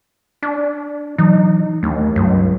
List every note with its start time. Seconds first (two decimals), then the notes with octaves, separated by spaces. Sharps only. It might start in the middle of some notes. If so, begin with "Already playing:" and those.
0.43 D4
1.18 E3 F#3 D#4
1.83 D#2 A3 D4
2.16 G1 C#2 F#2